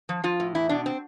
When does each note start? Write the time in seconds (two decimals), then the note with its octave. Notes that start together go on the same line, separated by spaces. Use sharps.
0.09 F3
0.24 F3 F4
0.40 A2
0.55 E2 E4
0.69 B2 D4
0.86 C4